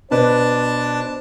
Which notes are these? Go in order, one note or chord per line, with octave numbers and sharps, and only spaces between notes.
B2 D4 B4 C5 A5